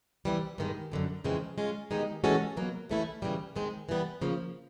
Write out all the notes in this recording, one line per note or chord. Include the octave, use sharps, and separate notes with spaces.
C3 E3 G3
G2 D#3 G#3
F#2 D3 F#3
F2 C#3 E3 G#3 C4
G#3 C#4 F4
D#3 G#3 B3 D#4 G4
E3 G#3 C#4 F#4 A4
B2 F#3 A#3
C#3 E3 A3 C#4 E4
C#3 E3 G3
D#3 G#3 C4
E3 G3 B3
C#3 F3 A#3